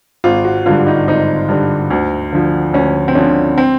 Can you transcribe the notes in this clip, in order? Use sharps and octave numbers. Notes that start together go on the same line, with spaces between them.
G#1 F4
F#4
G2 D3 F4
D#4
G#1 D#4
G2 D3
D2
D3 F3
D2 C#4
C4
D3 F3 C#4
C4